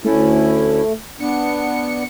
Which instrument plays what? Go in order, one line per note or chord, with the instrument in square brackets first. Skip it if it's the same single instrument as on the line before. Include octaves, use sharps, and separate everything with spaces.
[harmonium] D2 C#4 E4 [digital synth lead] A3
[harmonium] B3 D4 [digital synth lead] C#7